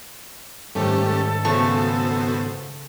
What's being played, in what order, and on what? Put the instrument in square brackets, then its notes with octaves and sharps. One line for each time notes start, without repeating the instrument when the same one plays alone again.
[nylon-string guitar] G#2 D#3 G3 [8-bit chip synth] A3 C#4 G4 [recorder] A4
[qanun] C#3 A3 C#6 [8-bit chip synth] B3 F#4 C5